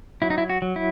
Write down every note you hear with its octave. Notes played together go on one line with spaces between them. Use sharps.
F#3 E4
D#4
E4
F#4
F#3
E4